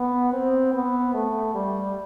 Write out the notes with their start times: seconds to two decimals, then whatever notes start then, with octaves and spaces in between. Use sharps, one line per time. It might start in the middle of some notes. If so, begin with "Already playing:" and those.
Already playing: B3
0.33 C4
0.73 B3
1.14 A3
1.55 G3